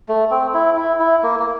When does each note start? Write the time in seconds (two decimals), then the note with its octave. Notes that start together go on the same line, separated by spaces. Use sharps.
0.08 A3
0.31 C4
0.54 E4
0.77 E4
1.00 E4
1.23 A#3
1.39 A#3